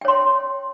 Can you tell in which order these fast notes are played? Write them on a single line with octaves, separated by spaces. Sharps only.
G5 C#5 C6